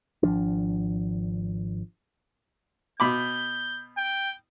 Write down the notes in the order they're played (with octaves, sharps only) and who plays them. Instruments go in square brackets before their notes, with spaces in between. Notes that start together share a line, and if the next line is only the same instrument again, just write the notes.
[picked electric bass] G#1 F3 D4
[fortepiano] B2 B5 D6 [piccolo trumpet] G6
[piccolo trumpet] G5